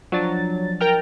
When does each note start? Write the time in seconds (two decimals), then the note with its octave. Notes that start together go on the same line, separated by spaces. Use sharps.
0.12 F3 F#3 D4 A6
0.81 A#4 G5 F6